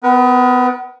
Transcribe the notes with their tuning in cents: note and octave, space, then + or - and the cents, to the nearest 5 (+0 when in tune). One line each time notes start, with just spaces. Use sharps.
B3 +25 B4 -45